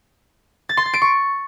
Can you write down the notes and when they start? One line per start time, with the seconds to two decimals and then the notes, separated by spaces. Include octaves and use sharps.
0.69 A6
0.77 C6
0.85 A6
0.94 D7
1.02 C#6